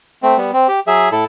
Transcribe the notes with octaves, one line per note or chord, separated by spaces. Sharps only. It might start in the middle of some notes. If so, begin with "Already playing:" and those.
A3 C4
G3 B3
C4
G4
F#3 G#4 E5
A2 E4 A4